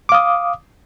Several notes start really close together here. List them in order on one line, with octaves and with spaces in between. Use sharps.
D6 F5 D#6